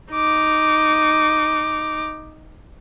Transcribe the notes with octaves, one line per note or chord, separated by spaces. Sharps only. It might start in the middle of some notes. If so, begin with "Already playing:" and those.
D#4 D6